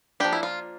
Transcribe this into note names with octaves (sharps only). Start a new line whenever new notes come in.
F3 A#3 D4 G4
E4
F4